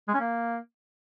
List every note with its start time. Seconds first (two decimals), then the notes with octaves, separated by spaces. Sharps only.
0.08 G#3
0.14 C#4
0.20 A#3